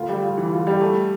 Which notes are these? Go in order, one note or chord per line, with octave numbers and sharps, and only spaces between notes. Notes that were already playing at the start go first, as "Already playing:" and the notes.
Already playing: D2 F4
G3
F4
E3
F4
G3
A3